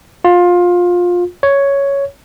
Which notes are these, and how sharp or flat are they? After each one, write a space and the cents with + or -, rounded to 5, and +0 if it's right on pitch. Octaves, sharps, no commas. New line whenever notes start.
F4 +20
C#5 +5